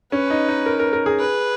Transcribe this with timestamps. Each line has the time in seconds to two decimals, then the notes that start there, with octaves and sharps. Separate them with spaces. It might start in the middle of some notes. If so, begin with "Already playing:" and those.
0.12 C#4 B4
0.30 D#4
0.48 D#4
0.66 A#4
0.79 A#4
0.93 A#4
1.06 G#4
1.19 B4